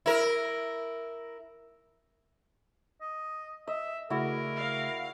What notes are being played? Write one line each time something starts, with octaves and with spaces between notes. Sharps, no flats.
E4 A#4
D#5
D#5 E5
C#3 A3 E4 F#4 G#4 A#4 D5
F5